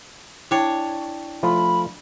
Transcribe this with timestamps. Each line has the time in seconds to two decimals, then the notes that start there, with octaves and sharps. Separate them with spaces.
0.51 D4 E4 C#5 G5
1.43 F3 A3 F4 B5